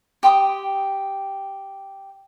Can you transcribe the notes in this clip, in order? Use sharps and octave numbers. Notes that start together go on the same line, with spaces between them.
G4 G5 C6 D#6